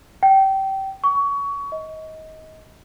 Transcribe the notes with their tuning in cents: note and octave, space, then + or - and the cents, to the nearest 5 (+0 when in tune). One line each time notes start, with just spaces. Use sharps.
G5 -25
C#6 +25
D#5 +25